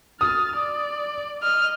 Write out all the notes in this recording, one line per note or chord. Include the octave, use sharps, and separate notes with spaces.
D#6 F6 A6
D5
D#5 F6